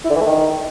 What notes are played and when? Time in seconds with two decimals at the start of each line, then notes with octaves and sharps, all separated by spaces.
0.05 E4
0.10 D3
0.16 E3
0.21 A3
0.26 D#3